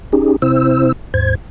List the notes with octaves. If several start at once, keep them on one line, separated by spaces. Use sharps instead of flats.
C#4 D#4 G4 G#4
C3 C4 E4 C5 E6
D#2 G#2 C5 G#6